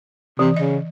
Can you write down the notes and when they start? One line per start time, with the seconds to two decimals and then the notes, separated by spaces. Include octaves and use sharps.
0.39 C3 E3
0.57 C#3 D#5